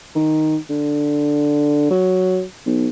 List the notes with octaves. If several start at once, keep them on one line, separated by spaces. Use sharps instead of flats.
D#3
D3
F#3
B1